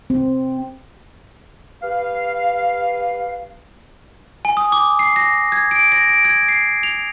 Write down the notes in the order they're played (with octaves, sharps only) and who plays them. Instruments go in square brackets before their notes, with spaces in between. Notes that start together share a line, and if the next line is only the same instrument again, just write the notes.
[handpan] C4
[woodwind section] G4 B4 F5
[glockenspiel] G#5
D#6
D6
C7
A#6
G#6
D7
A#6
D7
G#6
C7
F7